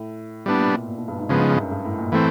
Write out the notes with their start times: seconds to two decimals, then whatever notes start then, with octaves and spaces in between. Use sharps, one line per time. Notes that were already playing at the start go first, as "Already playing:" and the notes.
Already playing: A2
0.46 A2 G3 B3 D4
0.56 A#2
0.67 B2
0.88 A#2
0.98 B2
1.08 G2
1.19 G#2
1.29 G2 C#3 F3 G#3 B3
1.39 G#2
1.51 G2
1.60 F#2
1.71 G2
1.85 A2
1.98 A#2
2.12 A2 E3 A3 C4